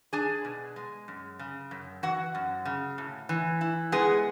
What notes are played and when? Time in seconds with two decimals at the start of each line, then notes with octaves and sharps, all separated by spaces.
0.13 D4 G#4 G#5
0.45 B2
0.76 G#3
1.08 F#2
1.39 C#3
1.71 F#2
2.03 E3 F#4 F#5
2.35 F#2
2.65 C#3
2.98 A2
3.29 E3
3.61 E4
3.92 G#3 B3 G#4